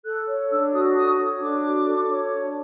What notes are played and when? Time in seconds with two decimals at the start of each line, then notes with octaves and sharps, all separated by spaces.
0.05 A4 F#6
0.28 C#5
0.51 D4 E6
0.74 F#4 D#6
0.96 A4 D#6
1.19 C#5
1.42 D4 D6
1.65 F#4
1.88 A4
2.11 C#5
2.33 D4